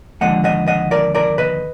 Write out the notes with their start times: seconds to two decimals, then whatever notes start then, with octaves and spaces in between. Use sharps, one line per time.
0.21 D#2 D3 F3 G#3 D#5 F#5
0.44 D#5 F#5
0.68 D#5 F#5
0.91 A#4 D5
1.15 A#4 D5
1.38 B4 D#5